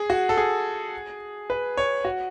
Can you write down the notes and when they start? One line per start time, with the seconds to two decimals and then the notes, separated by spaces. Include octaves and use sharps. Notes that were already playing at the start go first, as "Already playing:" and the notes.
Already playing: G#4
0.10 F#4
0.29 A4
0.37 G#4
1.50 B4
1.77 C#5
2.05 F#4